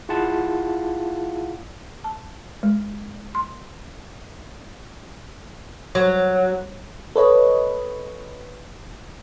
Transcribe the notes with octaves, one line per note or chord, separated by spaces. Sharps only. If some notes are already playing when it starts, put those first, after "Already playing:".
E4 F4 G#4 F5 F#5 A5
A5
G#3
C6
F#3
A4 B4 C#5 D#5